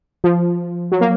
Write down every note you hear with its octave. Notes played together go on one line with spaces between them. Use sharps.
F3
F#3
A#3